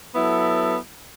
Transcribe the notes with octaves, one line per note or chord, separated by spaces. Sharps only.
F#3 B3 E4 A4